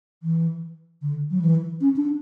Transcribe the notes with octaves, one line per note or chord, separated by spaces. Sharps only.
E3
D3
F#3
E3
C#4
D4